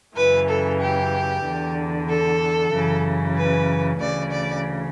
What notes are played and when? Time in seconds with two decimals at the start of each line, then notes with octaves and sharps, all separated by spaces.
0.16 F#2 C#3 E3 B4
0.48 A4
0.79 G4
1.44 E2 D3
2.08 A4
2.72 F#2 C#3 E3
3.35 B4
3.99 D2 C#3 E3 D5
4.31 D5